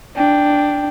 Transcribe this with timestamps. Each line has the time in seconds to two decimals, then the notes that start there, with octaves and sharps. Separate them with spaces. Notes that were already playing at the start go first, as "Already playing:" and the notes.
0.16 D4 G5